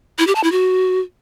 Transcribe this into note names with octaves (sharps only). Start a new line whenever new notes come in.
E4
G4
A5
E4
F#4